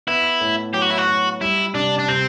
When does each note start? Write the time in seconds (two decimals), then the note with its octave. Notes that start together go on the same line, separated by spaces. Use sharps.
0.07 B3 E4
0.41 A2
0.74 F#3 G4
0.82 F#4
0.91 E4
0.98 F#4
1.07 F#3
1.41 G3 E4
1.74 C3 D4
1.99 D4
2.08 C3 C4